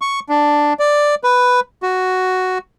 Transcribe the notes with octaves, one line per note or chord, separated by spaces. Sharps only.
C#6
D4
D5
B4
F#4